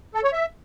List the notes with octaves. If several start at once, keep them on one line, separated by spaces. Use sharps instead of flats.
A4
C#5
E5